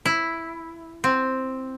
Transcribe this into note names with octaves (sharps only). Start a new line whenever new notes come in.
E4
C4